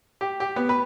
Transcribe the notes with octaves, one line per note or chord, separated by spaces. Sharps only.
G4
G4
B3
B4